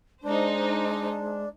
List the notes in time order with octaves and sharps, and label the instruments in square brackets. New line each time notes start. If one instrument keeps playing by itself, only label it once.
[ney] G#3 [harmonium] D4 [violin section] D#4 C5